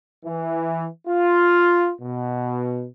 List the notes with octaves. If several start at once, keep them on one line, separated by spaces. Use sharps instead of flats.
E3
F4
B2